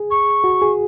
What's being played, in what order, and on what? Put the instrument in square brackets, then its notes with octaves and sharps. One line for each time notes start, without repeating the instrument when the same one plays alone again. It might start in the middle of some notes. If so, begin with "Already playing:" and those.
Already playing: [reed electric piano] G#4
[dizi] C#6
[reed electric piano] F#4
G#4